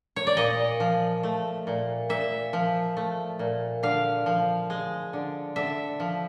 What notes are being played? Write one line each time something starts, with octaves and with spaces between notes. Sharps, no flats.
C#5
D5
A#2 D#5
F3
A3
A#2
A#2 E5
F3
A3
A#2
D3 F5
F3
G#3
D3
D3 E5
F3